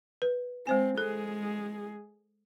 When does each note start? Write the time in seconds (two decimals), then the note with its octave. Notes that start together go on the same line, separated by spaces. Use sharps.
0.22 B4
0.67 G#3 C4 C5 G#5
0.98 G#3 G#4 A4